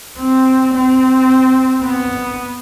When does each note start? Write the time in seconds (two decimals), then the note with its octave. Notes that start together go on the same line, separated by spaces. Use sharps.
0.19 C4
0.75 C4
1.83 B3